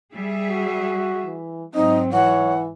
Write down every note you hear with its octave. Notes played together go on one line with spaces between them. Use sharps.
G3 G#4 E5
F#4
E3
G#2 F#3 C4 D#4 D#5
E3 C#5 F#5